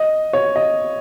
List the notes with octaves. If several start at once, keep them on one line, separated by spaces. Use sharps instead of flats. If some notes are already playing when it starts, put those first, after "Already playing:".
Already playing: D#5
C#5
D#5